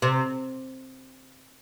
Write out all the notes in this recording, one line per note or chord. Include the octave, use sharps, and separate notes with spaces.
C3